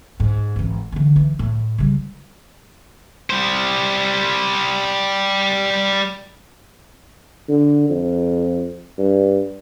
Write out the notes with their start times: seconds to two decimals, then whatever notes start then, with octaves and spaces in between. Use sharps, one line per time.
0.20 G#2
0.56 G#1 E3
0.92 D3 E3
1.16 E3
1.39 A2
1.78 C#3 G3
3.30 G3 C5
7.49 D3
7.90 F2
8.98 G2